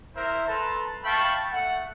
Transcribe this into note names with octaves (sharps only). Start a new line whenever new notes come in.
E4 A#4 C5 E5
A4 B4 A5 A#5 C6
E5 F5 G5 A5 B5 C#6
A3 F#5